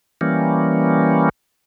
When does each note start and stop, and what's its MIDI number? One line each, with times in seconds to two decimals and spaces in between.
0.21 1.29 52
0.21 1.29 55
0.21 1.29 58
0.21 1.29 61